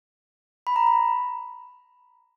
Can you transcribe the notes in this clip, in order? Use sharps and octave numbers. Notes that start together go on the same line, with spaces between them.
B5
A#5
B5